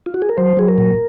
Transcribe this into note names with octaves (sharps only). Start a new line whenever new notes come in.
F4
F#4
G#4
A#4
F#3 C5
F#3 G#4
A#4
A#2